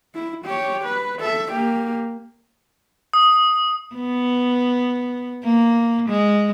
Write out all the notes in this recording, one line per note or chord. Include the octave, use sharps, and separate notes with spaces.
E4
G4 C#5
B4
A4 E5
A#3 G4
D#6
B3
A#3
G#3